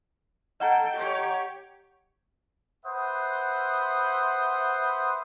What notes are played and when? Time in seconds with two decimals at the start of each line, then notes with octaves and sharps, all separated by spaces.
0.60 A4 D#5 F#5 G5 A#5
0.97 G4 C#5
2.85 B4 C5 E5 F#5 D#6